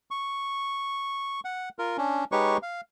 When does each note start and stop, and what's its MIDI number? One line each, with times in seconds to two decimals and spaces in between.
0.11 1.40 85
1.45 1.69 78
1.79 1.97 65
1.79 1.97 70
1.98 2.25 61
1.98 2.25 62
2.32 2.57 56
2.32 2.57 63
2.32 2.57 67
2.32 2.57 71
2.32 2.57 73
2.32 2.57 85
2.63 2.81 77